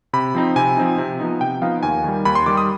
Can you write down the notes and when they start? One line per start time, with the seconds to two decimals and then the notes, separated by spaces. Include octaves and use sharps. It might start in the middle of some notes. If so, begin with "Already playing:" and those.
0.13 C3 B5
0.35 F3 C4 D#4
0.56 C3 G#5
0.77 F3 C4 D#4
0.98 C3
1.20 F3 B3 D#4
1.41 C3 G5
1.61 F3 B3 D#4 F5
1.83 D#2 G#5
2.04 D#3 G3
2.25 D#2 B5
2.35 C6
2.46 D#3 G3 D6
2.57 D#6